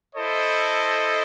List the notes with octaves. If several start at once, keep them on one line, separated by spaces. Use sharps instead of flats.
E4 A4 C5 D#5